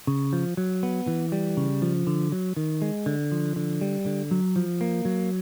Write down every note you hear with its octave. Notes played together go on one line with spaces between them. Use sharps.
C#3
F3
F#3
B3
E3
G3
C#3
F3
D3
F#3
D#3
G#3
D3
F3
D3
G3
D3
F#3
F3
A#3
F#3